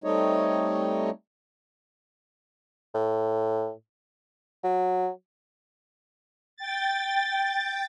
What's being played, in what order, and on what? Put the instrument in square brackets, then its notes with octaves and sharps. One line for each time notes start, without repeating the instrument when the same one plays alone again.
[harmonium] G3 A3 C4 D#4 C#5 D#5
[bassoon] A2
F#3
[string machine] G5 A6